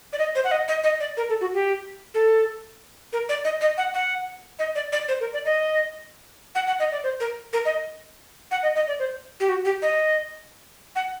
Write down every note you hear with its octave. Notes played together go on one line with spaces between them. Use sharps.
D5
D#5
C5
F#5
D#5
D#5
D#5
D5
A#4
A4
F#4
G4
A4
A#4
D5
D#5
D#5
F#5
F#5
D#5
D5
D5
C5
A#4
D5
D#5
F#5
F#5
D#5
D5
C5
A#4
A#4
D#5
F#5
D#5
D#5
D5
C5
G4
F#4
G4
D#5
F#5